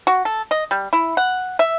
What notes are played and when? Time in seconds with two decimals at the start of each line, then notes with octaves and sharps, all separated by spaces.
0.07 F#4
0.25 A4
0.51 D#5
0.71 G3
0.93 E4
1.17 F#5
1.59 E5